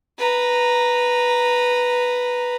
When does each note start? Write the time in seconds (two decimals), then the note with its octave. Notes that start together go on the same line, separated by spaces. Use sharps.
0.18 B4 A#5